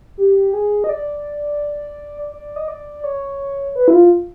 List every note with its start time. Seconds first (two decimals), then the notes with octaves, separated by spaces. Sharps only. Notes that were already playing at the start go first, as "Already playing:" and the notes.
0.18 G4
0.53 G#4
0.84 D#5
0.89 D5
2.32 D5
2.56 D#5
2.68 D5
3.04 C#5
3.75 B4
3.88 E4
3.93 F4